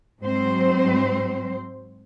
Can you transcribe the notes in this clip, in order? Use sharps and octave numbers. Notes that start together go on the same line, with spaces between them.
G#2 F#3 C4 C5